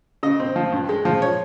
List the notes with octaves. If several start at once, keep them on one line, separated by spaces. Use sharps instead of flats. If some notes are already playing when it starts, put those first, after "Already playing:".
C#3 D#5
C4
F3
G2
G#3
F3
C#5